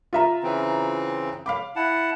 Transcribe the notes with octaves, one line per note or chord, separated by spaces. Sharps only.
F4 E5 A#5
C#3 E3 C4
F5 B5 D6
E4 F#5 A5